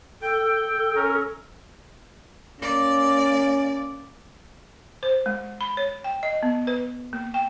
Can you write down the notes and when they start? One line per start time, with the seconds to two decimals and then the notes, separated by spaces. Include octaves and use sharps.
0.22 A4 G5
0.95 C#4 A#4
2.61 A#3 C#4 D5
5.03 C5
5.26 G#3
5.61 B5
5.77 C#5
6.04 G5
6.23 D#5
6.43 B3
6.67 B4
7.13 A#3
7.34 G5